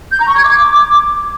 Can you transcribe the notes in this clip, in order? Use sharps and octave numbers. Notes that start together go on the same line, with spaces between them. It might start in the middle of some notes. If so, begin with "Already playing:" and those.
G6
A#5
C#6
G#6
D6